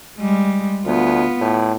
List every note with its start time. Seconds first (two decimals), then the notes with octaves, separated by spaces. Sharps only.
0.19 G3 G#3
0.86 D2 B3 F4
1.41 A2